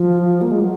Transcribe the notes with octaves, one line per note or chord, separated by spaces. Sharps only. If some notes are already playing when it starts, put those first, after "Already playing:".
Already playing: F3
A#3
G#3
F#3